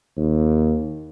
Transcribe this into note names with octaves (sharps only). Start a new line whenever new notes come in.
D#2